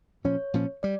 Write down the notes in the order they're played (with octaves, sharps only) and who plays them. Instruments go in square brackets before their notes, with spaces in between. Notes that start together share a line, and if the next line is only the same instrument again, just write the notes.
[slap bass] A#2 F3 C#4 [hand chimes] C#5
[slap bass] A#2 F3 C#4
[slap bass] G3 [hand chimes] D5